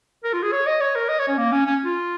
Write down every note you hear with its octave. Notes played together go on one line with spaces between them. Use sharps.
A#4
F4
G#4
C#5
D#5
C#5
A#4
D#5
C#5
C#4
A#3
C#4
C#4
F4